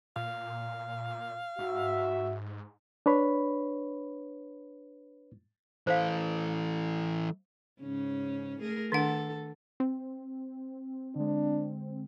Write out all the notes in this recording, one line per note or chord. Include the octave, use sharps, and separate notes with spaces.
A#2 F5
G#2 F#4 E5
D4 B4 C#5 B5
E3 A4 C5 F5
G#2 C#3 C#4
A3 G#4 A#4
D#3 D4 A4 F#5
C4
D3 G#3 D4